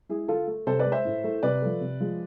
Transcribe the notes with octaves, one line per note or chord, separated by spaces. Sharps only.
G#3 E4 G#4
D3 F4 A4
A3
C3 A4 C5
B4 D5
G#3
C5 E5
A2
E3 A3
C3 B4 D5
F3 A3
C3
F3 G#3